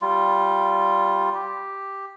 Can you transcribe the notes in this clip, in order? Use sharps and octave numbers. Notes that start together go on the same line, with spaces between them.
G3 F4
G4